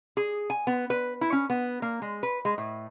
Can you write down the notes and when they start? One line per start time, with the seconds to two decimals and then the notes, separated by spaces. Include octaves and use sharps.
0.17 G#4
0.50 G#5
0.67 B3
0.90 B4
1.21 E4
1.32 C#4
1.50 B3
1.82 A#3
2.02 G#3
2.23 B4
2.45 G#3
2.58 A2